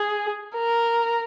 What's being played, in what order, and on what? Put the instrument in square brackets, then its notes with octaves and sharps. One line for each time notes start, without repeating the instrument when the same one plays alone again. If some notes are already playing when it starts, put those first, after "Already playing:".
Already playing: [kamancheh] G#4
A#4